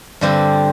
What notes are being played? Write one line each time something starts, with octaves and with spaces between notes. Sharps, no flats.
G2 D3 G3 C4